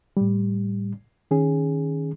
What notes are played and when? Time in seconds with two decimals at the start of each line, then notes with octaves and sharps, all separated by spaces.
0.17 A2 G3
1.31 D#3 C#4 G#4